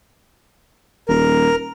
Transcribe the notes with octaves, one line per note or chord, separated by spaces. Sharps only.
D#1 A#4